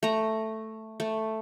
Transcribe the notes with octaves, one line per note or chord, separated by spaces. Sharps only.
A3 A#5
A3